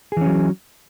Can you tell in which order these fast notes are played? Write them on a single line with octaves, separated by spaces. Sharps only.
G#4 E3 C#4 F#3